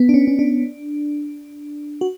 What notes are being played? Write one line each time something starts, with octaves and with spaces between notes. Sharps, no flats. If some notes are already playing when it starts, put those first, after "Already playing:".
Already playing: B3
D4
C#4
C#4
D4
F#4